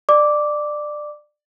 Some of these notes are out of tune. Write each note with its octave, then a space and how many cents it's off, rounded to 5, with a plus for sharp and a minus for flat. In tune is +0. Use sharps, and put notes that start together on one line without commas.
D5 +20 D6 -5